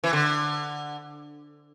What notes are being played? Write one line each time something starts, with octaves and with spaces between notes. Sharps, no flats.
E3
D3